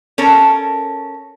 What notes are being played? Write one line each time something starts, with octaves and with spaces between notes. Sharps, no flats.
C#4 A4 A#4